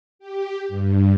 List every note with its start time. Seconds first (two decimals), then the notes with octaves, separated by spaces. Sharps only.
0.19 G4
0.68 G2